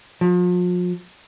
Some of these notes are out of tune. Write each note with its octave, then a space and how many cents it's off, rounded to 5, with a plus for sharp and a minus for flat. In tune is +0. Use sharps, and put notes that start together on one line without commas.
F3 +40